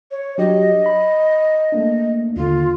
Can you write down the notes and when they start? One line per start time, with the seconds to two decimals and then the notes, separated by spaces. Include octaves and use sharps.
0.11 C#5
0.38 F#3 D4 G4 D#5
0.86 B5
1.72 A3 A#3 D4
2.36 D#2 D3 F4